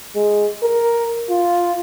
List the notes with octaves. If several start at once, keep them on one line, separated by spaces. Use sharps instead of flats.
G#3
A#4
F4